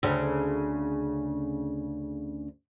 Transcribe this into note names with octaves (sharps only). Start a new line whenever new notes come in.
D2 C#3